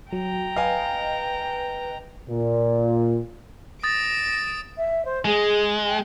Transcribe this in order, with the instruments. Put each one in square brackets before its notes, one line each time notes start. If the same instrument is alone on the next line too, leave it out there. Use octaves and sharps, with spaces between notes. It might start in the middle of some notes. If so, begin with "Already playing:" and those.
[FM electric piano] F#3 [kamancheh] G5 A#5
[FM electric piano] B4 D#5 [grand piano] F5 G#5
[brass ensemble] A#2
[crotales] D#6 A6 [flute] A#6 [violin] D7 E7
[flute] E5
C5
[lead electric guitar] G#3 [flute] G#4
[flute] G5